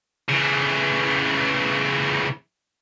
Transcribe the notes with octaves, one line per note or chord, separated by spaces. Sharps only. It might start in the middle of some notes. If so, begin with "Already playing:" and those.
C#3 E3